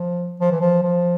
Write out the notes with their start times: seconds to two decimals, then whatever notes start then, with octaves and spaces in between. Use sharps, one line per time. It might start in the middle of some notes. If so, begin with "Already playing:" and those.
Already playing: F3
0.40 F3
0.51 E3
0.61 F3
0.83 F3